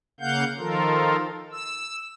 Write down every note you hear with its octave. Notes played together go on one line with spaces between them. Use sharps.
C#3 A#3 F5 F#5 G6
D#3 F3 F4 A4 A#4
E6